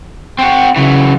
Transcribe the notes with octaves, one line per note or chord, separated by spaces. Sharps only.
C4 F#4
C#3 E3 F#3